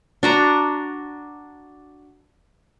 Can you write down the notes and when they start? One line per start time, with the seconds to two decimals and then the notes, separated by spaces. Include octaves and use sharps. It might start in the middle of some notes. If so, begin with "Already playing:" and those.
0.23 D4 F#4 A#5